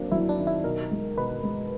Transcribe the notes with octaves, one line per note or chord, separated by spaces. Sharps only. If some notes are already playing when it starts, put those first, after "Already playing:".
Already playing: F#3 A#3 C4 D4
F#3 E4
D4
D#3
E4
B2 A#4
G#3
B2 B4
G#3